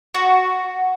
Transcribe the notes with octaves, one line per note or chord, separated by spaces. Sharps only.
F#4